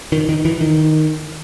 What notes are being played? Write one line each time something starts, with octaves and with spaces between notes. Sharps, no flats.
D#3
D#3
E3
D#3